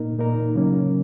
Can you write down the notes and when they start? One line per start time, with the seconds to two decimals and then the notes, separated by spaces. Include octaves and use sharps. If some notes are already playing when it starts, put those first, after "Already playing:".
Already playing: A#2 A#3 D#4 A#4
0.19 A#2 A#3 D#4 A#4
0.55 C#3 F#3 A#3 C#4